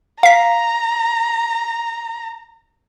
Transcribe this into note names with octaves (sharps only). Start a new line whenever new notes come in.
F5 A#5 B6